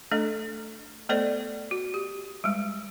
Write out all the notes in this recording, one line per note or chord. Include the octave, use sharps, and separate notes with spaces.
A3 D4 A4 D#5
A3 B3 A4 C5 D5 D#5
F#4
G4
G3 G#3